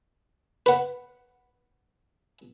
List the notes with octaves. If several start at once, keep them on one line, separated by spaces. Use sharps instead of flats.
B4 F#5